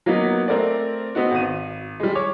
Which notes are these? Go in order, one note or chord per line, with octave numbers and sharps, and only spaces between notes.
F#3 A#3 B3 D#4 B4
A3 C4 A#4 C5 D5
B3 C4 D#4 F#4
G#1 D#7
G3 G#3
C#5 D6